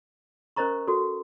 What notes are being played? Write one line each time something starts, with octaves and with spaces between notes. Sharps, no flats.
C#4 A#4 C5 D#5 A#5 C#6
F#4 A4